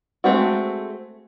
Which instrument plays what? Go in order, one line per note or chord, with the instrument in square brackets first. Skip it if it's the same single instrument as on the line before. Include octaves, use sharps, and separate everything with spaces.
[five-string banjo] G#3 A3 C4 F#4